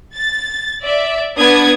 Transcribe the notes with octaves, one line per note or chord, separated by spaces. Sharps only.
A6
D5 E5
B3 D4 D#6 G#6